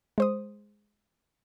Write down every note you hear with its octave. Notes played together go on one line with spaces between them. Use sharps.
G#3 C5 D#6